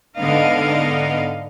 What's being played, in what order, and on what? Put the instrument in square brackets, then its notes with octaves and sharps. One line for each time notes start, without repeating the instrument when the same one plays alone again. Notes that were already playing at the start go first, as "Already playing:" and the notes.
[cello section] G#2 D3 B3 D#4 D#5 F5